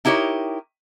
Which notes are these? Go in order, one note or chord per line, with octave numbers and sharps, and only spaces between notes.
D#4 E4 G4 A#4 C#5